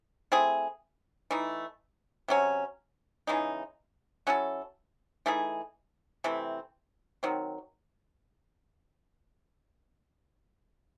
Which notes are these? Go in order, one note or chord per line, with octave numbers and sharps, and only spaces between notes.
A3 C4 E4 G#4
E3 A3 D#4
C3 F#3 C#4
C#3 E3 G#3 D#4
F#3 C#4 E4 A4
E3 A3 D#4 G#4
C3 E3 A3 C4
D#3 F#3 C4